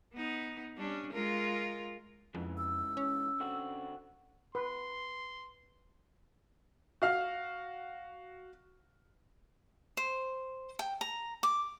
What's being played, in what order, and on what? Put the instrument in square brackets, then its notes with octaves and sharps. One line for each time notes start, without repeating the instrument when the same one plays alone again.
[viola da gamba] B3 D#4
G3 C#4 D4
G#3 F4 A#4
[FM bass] F2 [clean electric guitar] G#2 C#3 E3
[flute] E6
[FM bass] C#4
[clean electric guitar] D3 C4 F#4
[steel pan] B4 [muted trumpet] C6
[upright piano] F#4 F5 F6
[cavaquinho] C5
G5
A#5
D6